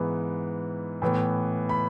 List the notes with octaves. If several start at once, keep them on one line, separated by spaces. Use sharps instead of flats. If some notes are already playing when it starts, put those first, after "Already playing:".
Already playing: G#2 E3 B3
A2 E3 B3
B5